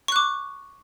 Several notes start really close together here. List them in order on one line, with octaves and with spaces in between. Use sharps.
C#6 F#6 D6